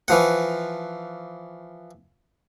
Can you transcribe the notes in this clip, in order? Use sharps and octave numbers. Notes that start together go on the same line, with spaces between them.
E3 F3 F#5